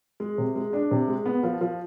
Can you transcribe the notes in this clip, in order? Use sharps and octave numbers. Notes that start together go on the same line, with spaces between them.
G#3
C3
G#3
D4
C3
G#3
B3
F3
F3